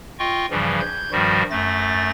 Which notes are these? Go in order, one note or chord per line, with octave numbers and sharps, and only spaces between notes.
F4 D#5 G5 C#6
G2 C#3 E3 F3 G3
G6 G#6
G2 D#3 F3 G3 F#4
F#2 A3 A6 A#6